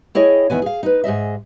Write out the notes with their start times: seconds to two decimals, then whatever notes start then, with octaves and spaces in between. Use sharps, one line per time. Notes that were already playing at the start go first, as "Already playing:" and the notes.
0.15 E4 G#4 C#5 D#5 G5
0.50 E2 D#3 B3 G#5
0.62 G#4 F5
0.83 D#4 B4
1.04 G#2 G#4 D#5 E5